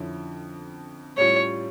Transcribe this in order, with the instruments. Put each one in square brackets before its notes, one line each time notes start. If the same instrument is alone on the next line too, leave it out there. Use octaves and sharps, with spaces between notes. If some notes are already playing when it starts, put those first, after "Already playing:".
Already playing: [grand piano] F2 D3 F3 C#4 E4
[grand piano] A2 G3 C#4 F4 [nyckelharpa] C#5